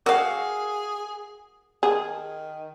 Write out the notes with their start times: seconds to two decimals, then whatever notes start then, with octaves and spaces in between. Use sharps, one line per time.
0.06 F#4 G#4 A#4 F5 G5
1.83 D#3 G#4